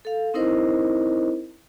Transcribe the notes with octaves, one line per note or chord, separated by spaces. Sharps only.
A4 F5
C4 D#4 E4 A#4 C5 D#5